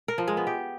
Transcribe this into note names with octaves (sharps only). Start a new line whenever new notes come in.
A#4
F3
G#3
B3
G4